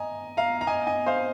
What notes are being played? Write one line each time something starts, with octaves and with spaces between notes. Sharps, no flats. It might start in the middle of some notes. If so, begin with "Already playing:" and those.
Already playing: D#5 G#5 A#5
F5 A#5
A#5
D#5 G#5
D#5 G#5
C5 F5